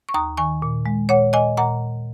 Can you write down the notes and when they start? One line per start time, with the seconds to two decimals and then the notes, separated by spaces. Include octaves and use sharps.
0.09 C#6
0.14 D#2 A#5 D#6
0.37 D#3 G#5 C#6
0.62 A#2
0.86 G#3
1.09 A#2 C#5 F#5
1.33 A#2 D#5 G#5
1.57 A#2 F#5 A#5